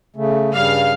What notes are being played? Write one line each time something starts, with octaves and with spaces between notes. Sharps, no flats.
C#3 A3
G2 C#3 G3 F5